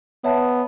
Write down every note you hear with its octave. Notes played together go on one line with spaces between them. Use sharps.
B3 C#5 E5 A5